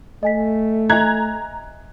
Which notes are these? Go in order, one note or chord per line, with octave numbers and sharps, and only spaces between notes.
A3 D#5 G#5 B6
D#5 E5 G#5 A#5 F#6 G#6